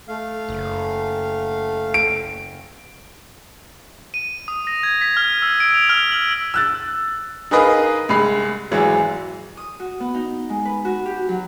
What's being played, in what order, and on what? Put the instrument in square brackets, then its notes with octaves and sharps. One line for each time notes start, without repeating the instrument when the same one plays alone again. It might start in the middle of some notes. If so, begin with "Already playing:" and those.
[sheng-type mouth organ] A3 F5
[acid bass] F#1
[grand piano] D7
[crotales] D#7
D#6
A#6
G#6
B6
F6
E6
D7
F7
F6
F#7
[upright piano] E6 F#6 A6
D#4 G#4 A#4 B4 D#5 F5
C2 G#3 B5 C7
G#1 E3 F#3 G#3
[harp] D#6
F#4
B3
D#4
G#3
B4
F#4
G4
F#3